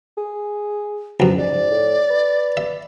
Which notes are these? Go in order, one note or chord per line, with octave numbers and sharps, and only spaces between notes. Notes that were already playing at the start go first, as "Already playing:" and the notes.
G#4
C#2 F#2 F3 B4
G#2 D5
A2
B4
E5